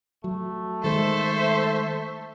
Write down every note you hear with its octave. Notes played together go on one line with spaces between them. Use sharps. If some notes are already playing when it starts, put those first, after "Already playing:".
F#3 A3
D#3 G#3 A4 C5 E5